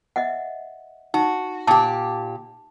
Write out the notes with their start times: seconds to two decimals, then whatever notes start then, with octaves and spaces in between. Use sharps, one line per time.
0.16 D#5 E5 F#5
1.14 D#4 F#4
1.67 A#2 G4 A5